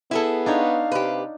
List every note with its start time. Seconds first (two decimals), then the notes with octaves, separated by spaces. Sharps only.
0.11 B3 E4 G#4 A4
0.46 D4 D#4 C#5 F5
0.92 C3 G4 B4